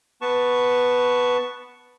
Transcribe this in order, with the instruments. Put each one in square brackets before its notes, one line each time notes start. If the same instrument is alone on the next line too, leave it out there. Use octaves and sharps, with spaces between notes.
[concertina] B3 B4 A5 C#6